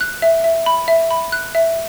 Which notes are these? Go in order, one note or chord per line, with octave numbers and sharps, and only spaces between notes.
F#6
E5
E5
B5
E5
B5
F#6
E5